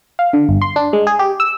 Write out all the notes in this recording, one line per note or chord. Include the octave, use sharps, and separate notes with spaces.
F5
D3
G1
C6
D4
G#3
G#4
G4
E6